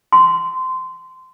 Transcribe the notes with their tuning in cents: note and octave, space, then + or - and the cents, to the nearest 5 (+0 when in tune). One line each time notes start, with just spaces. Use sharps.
C6 -20